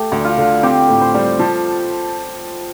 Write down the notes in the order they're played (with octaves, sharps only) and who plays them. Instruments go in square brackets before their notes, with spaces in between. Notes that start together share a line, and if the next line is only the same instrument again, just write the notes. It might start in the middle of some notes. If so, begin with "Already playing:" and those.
Already playing: [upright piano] A3 [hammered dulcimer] G4 A4
[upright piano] D2
[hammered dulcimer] F4
[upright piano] D3
[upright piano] C4 [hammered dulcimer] G4
[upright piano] A2
[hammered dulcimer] C5
[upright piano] G3
[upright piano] F3 [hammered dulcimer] A4